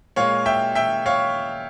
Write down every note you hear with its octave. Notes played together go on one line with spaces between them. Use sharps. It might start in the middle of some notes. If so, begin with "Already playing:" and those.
A#2 G#3 C#5 F5
E5 G5
E5 G5
C#5 F5